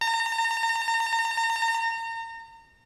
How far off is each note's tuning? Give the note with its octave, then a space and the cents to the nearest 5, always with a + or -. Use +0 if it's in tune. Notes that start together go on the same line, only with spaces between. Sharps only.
A#5 -35